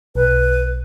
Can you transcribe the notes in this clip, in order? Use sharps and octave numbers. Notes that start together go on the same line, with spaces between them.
B1 B4